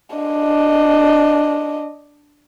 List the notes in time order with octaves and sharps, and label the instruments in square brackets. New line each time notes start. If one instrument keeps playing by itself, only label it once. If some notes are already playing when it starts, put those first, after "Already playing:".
[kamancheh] D4 D#5